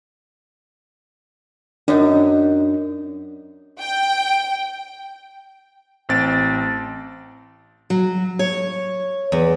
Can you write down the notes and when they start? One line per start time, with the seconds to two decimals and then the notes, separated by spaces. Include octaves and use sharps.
1.88 F#2 D4 D#4
3.79 G5
6.09 A1 C4 A6 D7
7.90 F#3
8.39 C#5
9.32 E2